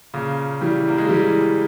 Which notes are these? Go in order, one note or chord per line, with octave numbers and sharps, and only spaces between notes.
A#2 C#3
E3 G3
A#3
G#3
E3 G3